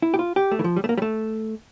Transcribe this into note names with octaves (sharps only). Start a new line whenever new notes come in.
E4
G4
F4
G4
A3
E3
F3
G3
A3
A#3
G3
A3